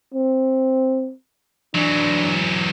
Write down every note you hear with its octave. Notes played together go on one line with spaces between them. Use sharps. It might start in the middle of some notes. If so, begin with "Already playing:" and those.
C4
E3 F#3 D4